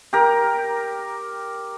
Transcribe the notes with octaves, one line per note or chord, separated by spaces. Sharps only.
G4 A#4